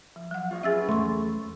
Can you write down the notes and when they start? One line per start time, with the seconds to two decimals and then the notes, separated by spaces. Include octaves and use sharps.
0.16 F3
0.31 F#3 F#5
0.51 F4 C#5 D#5
0.63 C#4 G#4 B4 E5 E6 A6
0.89 E2 A3 C6 C#6